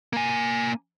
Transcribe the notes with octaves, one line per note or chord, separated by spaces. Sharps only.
A#3 G#5